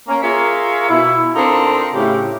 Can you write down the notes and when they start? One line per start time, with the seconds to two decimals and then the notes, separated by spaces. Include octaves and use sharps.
0.08 A#3 C#4
0.23 F4 G#4 A#4 C#5 E5 F5
0.89 B2 E4
1.35 C4 D4 D#4 F4 A4 A#4
1.94 A2 C#3 G4